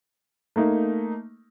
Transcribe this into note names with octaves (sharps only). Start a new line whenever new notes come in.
A3 A#3 D#4